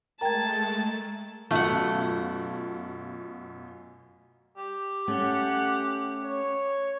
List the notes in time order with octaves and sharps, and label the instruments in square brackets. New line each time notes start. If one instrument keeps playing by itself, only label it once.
[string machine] G#3 A3 [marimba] A#4 G5 [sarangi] A5 [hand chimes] A#5 G#6
[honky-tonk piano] F#2 B2 F4 [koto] A3 F#5
[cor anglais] G4
[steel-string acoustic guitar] A3 C#4 [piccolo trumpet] F#5
[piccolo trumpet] C#5